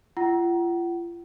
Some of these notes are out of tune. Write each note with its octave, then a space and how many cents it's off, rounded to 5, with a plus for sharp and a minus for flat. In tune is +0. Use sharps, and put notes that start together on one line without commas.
F4 -35 F#5 +35